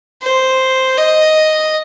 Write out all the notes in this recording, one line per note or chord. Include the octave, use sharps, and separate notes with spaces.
C5
D#5